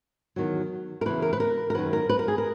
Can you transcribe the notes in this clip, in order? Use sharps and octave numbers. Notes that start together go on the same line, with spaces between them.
E2 D#3 F#3
A#4
E2 C#3 E3 B4
A#4
B4
A#4
A#4
F#2 D#3 F#3 B4
A#4
B4
A#4
G#4
A#4